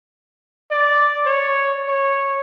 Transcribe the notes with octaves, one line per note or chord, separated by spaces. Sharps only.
D5
C#5
C#5